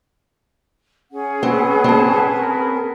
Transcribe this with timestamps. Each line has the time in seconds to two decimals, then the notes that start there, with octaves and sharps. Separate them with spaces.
1.12 C#4 G#4 F#5
1.43 C4 B4
1.84 C4 A5
2.39 A#4 B4